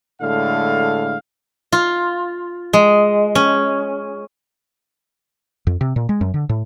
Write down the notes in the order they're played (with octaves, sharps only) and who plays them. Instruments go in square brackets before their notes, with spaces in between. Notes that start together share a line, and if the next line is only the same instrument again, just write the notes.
[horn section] A2 D3 G#3 F5
[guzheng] F4
G#3
C#4
[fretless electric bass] F2
C3
A#2
G#3
F#2
D3
A2